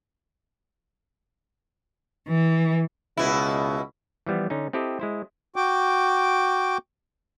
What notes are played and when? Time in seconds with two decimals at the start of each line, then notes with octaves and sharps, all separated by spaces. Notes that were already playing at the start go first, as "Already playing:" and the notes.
2.28 E3
3.17 C#2 B2 E4
4.26 E3 F3 G3 B3
4.50 D3 C#4 D#4
4.73 C4 E4 G4 A4 D#5
5.00 G#3 E4 C5
5.56 F#4 G5 D6